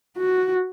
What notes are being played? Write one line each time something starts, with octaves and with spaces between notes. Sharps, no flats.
F#4